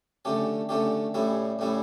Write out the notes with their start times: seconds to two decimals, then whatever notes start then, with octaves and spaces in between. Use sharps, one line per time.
0.25 D3 A3 C#4 G4
0.69 D3 A3 C#4 G4
1.14 A2 G3 C#4 E4
1.59 A2 G3 C#4 E4